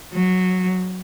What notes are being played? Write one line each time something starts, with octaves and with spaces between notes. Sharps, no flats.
F#3